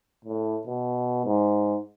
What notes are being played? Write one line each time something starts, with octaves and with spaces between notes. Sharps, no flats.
A2
B2
G#2